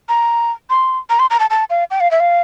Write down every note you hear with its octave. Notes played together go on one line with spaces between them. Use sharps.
A#5
C6
A#5
C6
A#5
A5
A5
F5
G5
F5
E5
F5